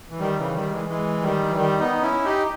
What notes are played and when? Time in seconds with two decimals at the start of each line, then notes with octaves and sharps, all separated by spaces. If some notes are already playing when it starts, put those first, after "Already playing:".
0.10 E3
0.20 D#3 G3
0.37 C#3 E3
0.54 D#3 G3
0.71 E3 G#3
0.88 E3 G#3
1.22 D#3 G3
1.50 E3
1.56 D#3 G3
1.79 B3 D#4
2.02 C#4 E4
2.24 D#4 G4